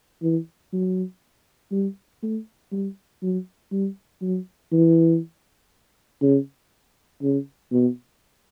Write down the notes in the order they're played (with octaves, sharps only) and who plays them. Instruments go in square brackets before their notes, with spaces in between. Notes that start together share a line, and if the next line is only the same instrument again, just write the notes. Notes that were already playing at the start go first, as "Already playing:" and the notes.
[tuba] E3
F#3
G3
A3
G3
F#3
G3
F#3
E3
C#3
C#3
B2